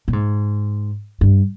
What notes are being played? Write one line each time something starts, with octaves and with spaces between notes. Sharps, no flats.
A#2
G#2
G2